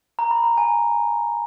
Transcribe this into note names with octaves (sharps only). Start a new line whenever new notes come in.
A#5
B5
A#5
G#5